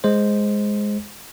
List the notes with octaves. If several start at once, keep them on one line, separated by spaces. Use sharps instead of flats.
G#3 C5